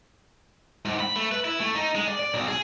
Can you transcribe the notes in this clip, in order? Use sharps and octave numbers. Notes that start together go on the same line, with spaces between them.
G#2
B5
A3
B4
E4
A3
D#4
G#3
D5
D5
B1
G#4